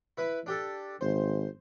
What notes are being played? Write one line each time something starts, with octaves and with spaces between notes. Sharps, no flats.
E4 B4 B5
D4 G4 A4
G#1 C5